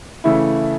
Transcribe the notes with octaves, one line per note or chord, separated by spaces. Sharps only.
C#3 E3 A3 E4